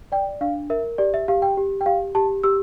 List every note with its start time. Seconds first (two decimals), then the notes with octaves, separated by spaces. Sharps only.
0.12 D5 G5
0.41 D4 F5
0.70 A#4 E5
0.98 G4 D5
1.14 E5
1.28 G4 F5
1.42 G5
1.57 G4
1.81 G5
1.86 G4 F5
2.15 G4 A5
2.43 G4 E6